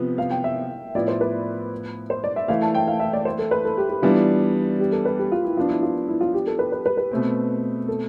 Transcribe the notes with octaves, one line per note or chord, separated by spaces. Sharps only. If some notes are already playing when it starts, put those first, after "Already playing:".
Already playing: C3 F3 B3
F5
G5
E5
A2 F3 B3 E4 D5
C5
B4
C5
D5
E5
E3 A3 E4 F5
A5
G5
F5
E5
D5
C5
A4
B4
A4
G4
G4
E3 G3 B3 D4 F4
G4
A4
B4
G4
F4
E4
F3 B3 D4 F4
E4
F4
E4
F4
G4
A4
B4
B4
B4
B4
B2 A3 C4
A4